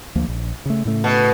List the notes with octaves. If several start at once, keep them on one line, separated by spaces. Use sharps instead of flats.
D2 F3 A#3
A#1
C#3 A3
A2 C#3 A3
B2